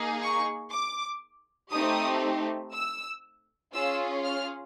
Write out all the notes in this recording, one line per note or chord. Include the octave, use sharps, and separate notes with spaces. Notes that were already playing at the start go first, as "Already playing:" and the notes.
Already playing: A#3 D#4 G#4
C#6
D6
A3 C4 D#4 G4 D#6
E6
C#4 F4 G#4 E6
F6